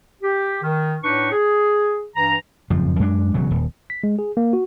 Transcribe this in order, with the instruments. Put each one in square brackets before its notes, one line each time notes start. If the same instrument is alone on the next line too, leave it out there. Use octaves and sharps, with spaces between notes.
[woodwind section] G4
D#3
A2 D4 D#4 B4 C#6
G#4
G2 E3 A#5
[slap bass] F#1 F2 G#2 F3
F#2 G#3 B3 D4
E1 C#3 F#3
D#1
[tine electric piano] B6
G#3
G#4
A#3
F#4